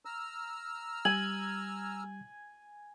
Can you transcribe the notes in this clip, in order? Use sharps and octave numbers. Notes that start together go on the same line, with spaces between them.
A#5 E6 F6
G3 G#5 F#7